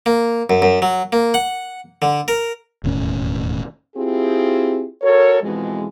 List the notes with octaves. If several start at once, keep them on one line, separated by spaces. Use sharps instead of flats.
A#3
F#2
F#2
F#3
A#3
F#5
D3
A#4
E1 D#2 A2 C#4
C4 E4 F4 G4 G#4
F#4 A4 A#4 C#5
F2 B2 E3 G#3